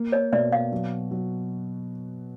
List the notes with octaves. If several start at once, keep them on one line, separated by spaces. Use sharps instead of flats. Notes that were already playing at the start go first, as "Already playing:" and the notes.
Already playing: A#3
C#5 D#5
B2 D5 E5
D#5 F5
F#3
F#3